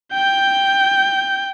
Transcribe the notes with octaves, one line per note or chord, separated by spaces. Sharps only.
G5 G6